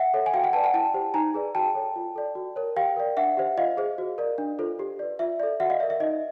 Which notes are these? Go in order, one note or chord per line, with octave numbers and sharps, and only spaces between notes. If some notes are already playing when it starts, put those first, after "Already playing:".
Already playing: E5 F#5
A4 C#5
G#5
F#4 F5 G5
F#5 G#5
B4 D5 G5 A5
F#5 G#5
E4 G5 A5
G4 C5
D#4 G#5 A#5
G#4 B4 D5
F#4 G5 A5
A4 C#5
F4
A4 D5
F#4
A#4 C#5
G4 F5 G5
A#4 D5
D4 E5 F#5
G4 C5
F4 D#5 F5
G#4 C5
F#4
A#4 D5
D4
F4 A4 C5
G4
B4 D5
F4 E5
A4 D5
F#4 E5 F#5
D#5 F5
A#4 D5 E5
E5
D#4 D#5